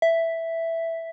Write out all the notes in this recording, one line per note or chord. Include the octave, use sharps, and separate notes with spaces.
E5